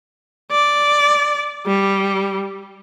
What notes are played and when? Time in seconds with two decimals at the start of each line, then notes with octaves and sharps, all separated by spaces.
0.52 D5
1.67 G3